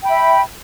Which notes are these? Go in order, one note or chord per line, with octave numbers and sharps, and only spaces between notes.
E5 G5 B5